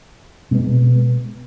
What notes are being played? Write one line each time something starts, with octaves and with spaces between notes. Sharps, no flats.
B2 G#3 B3